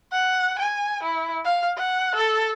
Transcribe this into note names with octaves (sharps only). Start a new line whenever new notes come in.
F#5
G#5
E4
F5
F#5
A4